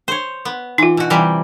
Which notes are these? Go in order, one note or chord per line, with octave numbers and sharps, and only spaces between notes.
C5 C#5
B3
E3 D#4 F4
B2 F#4
C3 E3 G3